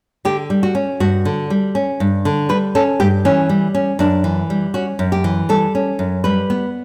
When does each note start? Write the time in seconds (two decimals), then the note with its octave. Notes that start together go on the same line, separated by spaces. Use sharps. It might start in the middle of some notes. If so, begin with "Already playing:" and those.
0.25 D3 G4
0.50 G3
0.63 F#4
0.75 C#4
1.00 G2 F#4
1.25 D3
1.50 G3
1.75 C#4
2.00 G2
2.25 D3
2.49 G3 B4
2.75 C#4 A4
3.00 G2 G4
3.25 E3 C#4
3.49 G3
3.75 C#4
3.99 F#2 D4
4.24 E3
4.50 G3
4.74 C#4 F#4
4.99 F#2
5.12 G4
5.24 E3
5.49 G3 A4
5.75 C#4
5.99 F#2
6.24 G3 B4
6.50 B3